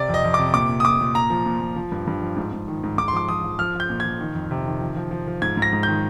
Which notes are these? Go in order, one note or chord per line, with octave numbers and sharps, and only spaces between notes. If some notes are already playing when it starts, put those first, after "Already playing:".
Already playing: C3 D5
F2
D#5
F2
C3 D6
A#2 D6
A#2
D#6
A#2 D6
A#2
A#2 A#5
F3
A#2
A#2
F3
G2
G2
F3
G#2
G#2
D#3
G#2
G#2 D6
C6
F3 D6
F3 D#6
F3
F3 F6
F3
G6
A#2
F3 G#6
D#3
F2
C3
D#3
F3
F3
F3
F3
G#2 G#6
G#2
A#6
G#2
D#3 G6